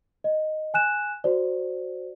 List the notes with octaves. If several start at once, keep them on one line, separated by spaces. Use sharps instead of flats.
D#5
G#5 F#6 E7
F#4 C5 D5